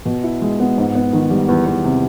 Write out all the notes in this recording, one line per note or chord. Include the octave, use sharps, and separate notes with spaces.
B2
E4
G#3
B3
G#2
B3
D#3
G3
E2
E2
C3